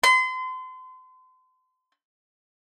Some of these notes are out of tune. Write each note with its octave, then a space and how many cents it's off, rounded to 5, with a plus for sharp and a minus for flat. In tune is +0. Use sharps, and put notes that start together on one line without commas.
C6 -35